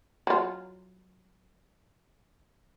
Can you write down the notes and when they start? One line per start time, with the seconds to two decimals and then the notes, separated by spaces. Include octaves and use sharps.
0.27 F#3 F4